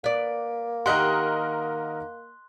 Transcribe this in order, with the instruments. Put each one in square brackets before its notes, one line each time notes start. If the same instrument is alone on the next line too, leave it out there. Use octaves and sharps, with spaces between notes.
[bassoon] A#3 [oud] B4 D5
[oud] D#3 G4 [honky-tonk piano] A#4 D#5 F#5 [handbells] C6 F#6